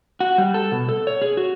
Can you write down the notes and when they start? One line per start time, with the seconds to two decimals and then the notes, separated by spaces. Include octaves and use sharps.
0.20 F#4
0.38 G3
0.54 A4
0.72 B2
0.89 A4
1.07 C#5
1.22 G#4
1.37 F#4